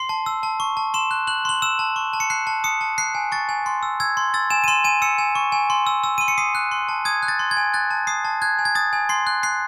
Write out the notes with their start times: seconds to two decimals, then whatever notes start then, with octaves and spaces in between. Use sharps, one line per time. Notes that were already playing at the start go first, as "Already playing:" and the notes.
Already playing: C6 C7
0.09 A5
0.26 E6
0.43 A5
0.60 C#6
0.77 A5
0.94 C6 E7
1.11 F#6
1.27 F#6 F#7
1.45 C6 F#7
1.62 E6 E7
1.79 A5
1.96 C#6
2.13 A5
2.20 C#7
2.30 F#6 C7
2.47 A5
2.64 D#6 C#7
2.81 A5
2.98 F#6 C7
3.15 G#5
3.32 C#6 A6
3.49 G#5
3.66 C6
3.83 E6
4.00 E6 G#6
4.17 C6
4.34 E6 A6
4.50 G#5 E7
4.64 D#7
4.68 C6 E7
4.84 G#5 D#7
5.02 E6 C#7
5.18 G#5
5.35 C#6
5.52 G#5
5.70 C6
5.87 E6
6.04 E6
6.18 C6 D#7
6.28 C#7
6.38 D#6 C7
6.55 F#6
6.71 C6
6.89 A5
7.05 D#6 G#6
7.23 F#6
7.28 A6
7.39 C6
7.51 G#6
7.57 G#5
7.74 F#6 A6
7.91 A5
8.07 D#6 C7
8.25 A5
8.42 F#6 G#6
8.59 G#5
8.65 G#6
8.75 D#6 A6
8.93 G#5
9.09 C6 C7
9.27 F#6
9.43 F#6 C7